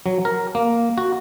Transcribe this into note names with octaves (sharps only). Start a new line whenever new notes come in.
F#3
A#4
A#3
F#4